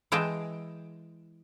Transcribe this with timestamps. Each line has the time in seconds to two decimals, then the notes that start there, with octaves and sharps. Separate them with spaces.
0.12 E3 G#3 G5 A5